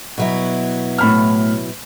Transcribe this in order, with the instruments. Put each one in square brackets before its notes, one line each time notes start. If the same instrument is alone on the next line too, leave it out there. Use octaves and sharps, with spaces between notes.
[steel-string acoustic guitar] B2 F#3 E4
[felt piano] A2 B5 F6